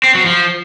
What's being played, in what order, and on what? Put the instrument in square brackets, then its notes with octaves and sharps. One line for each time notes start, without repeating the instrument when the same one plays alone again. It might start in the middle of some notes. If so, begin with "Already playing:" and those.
[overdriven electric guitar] C4
F#3
F3